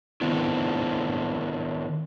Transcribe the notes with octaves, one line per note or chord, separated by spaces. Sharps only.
D#3 B3 C4 D4 E4